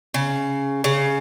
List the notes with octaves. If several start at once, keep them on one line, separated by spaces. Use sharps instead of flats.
C#3
C#3